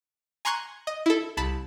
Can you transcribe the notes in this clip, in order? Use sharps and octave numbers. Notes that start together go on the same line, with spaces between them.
G#5 A#5 C6 C#6 F#6 G#6
D#5
E4 A4
C2 A5 B5